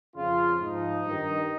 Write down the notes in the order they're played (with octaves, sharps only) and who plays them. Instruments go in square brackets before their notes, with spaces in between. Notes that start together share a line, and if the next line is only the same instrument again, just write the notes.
[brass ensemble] F2 C#3 F3 F4
G#2 F3 D#4
G2 D#3